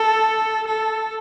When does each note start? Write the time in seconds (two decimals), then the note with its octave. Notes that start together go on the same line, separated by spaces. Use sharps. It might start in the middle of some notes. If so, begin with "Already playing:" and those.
Already playing: A4
0.67 A4